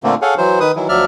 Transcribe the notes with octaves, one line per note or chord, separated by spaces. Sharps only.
A#2 D3 A3 A#3 C4
G#4 A4 C#5 F5 F#5 G#5
E3 F#3 C5
D#3 B4 D#6
D#3 E3 F#3 E4
D2 F3 F#3 D5 E5 F6